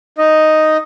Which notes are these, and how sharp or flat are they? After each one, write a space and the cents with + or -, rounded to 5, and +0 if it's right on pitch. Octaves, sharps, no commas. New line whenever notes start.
D#4 +0 D#5 +0